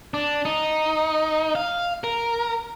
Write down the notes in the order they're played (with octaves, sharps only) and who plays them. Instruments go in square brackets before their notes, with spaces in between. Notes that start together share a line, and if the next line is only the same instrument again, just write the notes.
[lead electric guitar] D4
D#4
F5
A#4